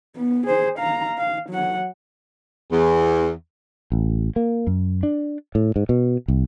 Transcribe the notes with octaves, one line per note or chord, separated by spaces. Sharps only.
B3
G#4 C5
F5 A#5
F5
F#3 F#5
E2
A1
A#3
F#2
D4
A2
G#2
B2
C2